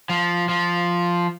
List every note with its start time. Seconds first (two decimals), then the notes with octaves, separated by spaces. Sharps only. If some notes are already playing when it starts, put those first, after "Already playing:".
0.09 F3
0.49 F3